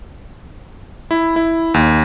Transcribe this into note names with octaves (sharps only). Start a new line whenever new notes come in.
E4
E4
D#2